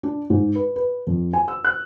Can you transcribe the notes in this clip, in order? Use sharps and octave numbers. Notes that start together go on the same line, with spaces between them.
D4
G#2
B4
B4
F2
G#5
E6
F#6